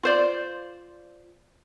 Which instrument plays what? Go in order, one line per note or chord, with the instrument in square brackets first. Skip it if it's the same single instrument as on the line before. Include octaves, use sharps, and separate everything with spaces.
[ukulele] F4 C5 D5